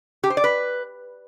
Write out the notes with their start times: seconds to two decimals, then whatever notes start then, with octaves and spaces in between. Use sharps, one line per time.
0.24 G4
0.30 C5
0.37 D5
0.44 B4